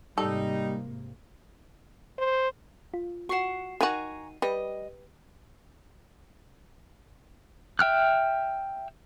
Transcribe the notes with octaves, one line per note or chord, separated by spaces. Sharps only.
G#2 C3 G3 A#3 D#4 A4
C5
F4
F#4 F#5 C#6 C7 E7
D#3 F#4 G#5 A#5 C#6 D#7
G3 B4 D#5
E5 G5 F6 F#6